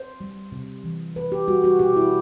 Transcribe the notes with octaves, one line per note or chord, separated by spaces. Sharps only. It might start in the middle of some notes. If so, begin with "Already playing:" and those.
Already playing: C5
G3
C3
E3
C3 B4
G4
G3 F#4
F#4
B2 G4
E4